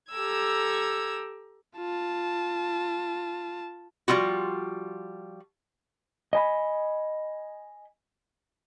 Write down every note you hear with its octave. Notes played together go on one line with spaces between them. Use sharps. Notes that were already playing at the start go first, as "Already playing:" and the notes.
G4 A4 A#5 E6 G#6
F4 A5
F3 G3 C4 F4 F#4
D#5 G#5 B5